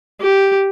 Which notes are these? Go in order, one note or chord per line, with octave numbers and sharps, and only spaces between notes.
G4